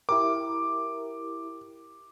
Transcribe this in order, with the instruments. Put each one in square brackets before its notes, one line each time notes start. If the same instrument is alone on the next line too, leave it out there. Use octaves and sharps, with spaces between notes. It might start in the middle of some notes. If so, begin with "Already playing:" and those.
[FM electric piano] E4 G4 A#4 [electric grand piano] D6